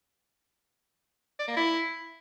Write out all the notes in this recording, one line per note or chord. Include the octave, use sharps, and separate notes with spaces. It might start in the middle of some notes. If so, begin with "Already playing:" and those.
D5
A#3
E4